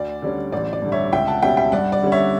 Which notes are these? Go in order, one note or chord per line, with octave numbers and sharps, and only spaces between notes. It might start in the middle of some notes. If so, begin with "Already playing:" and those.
Already playing: D2 D5
D3 G3 C#4
A1 D5
D5
G2 D3
C#5 E5
C#2 E5 G5
F#5 A5
B2 G3 C#4 E5 G5
E5 G5
G2 D5 F#5
D5
D3 G3 C#4
C#5 E5